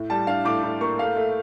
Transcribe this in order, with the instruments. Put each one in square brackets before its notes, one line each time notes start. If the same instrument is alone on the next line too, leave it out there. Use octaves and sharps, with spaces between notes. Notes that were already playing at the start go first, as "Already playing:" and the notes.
Already playing: [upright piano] A2
G3 A5
D4 F5
A2 D6
A2
A#3 C#6
A3 F5
A3